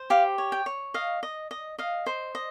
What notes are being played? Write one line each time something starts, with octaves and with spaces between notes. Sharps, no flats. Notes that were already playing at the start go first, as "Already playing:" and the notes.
Already playing: C5
G4 F5
C#5
G5
C#5
D#5 F5
D#5
D#5
D#5 F5
C5
D#5